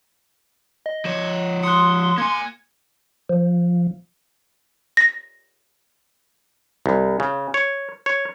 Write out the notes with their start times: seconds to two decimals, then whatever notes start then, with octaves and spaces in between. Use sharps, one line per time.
0.86 D#5
1.05 F3 C#5 E7
1.63 C6 D#6 F#6 C#7
2.18 A#3 G#5 G#6 C#7
3.29 F3
4.97 A#6
6.86 C2
7.20 C#3
7.54 C#5
8.06 C#5